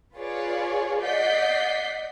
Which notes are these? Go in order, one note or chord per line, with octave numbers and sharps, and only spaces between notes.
F4 G#4 B4 C#5 D5
D5 D#5 F#5 G6 B6 C7